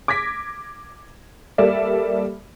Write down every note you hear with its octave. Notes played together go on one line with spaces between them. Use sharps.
D6 G#6 A#6 B6
G3 A#3 A4 D5 E5